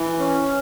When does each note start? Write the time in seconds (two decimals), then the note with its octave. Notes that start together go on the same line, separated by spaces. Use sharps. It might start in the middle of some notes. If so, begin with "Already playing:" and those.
Already playing: E3
0.19 C#4